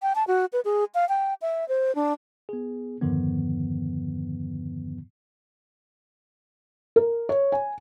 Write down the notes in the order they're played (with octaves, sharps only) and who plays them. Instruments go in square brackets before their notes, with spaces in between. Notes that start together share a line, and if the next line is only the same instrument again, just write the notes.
[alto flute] G5
A5
F#4
B4
G#4
F5
G5
E5
C5
D4
[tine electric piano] B3 G#4
E2 G2 D3 D#3 F3 B3
[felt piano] A#4
C#5
G#5